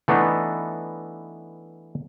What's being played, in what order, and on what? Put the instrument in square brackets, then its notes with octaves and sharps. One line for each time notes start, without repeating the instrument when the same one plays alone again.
[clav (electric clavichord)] E3 A3 B3 D4 D#4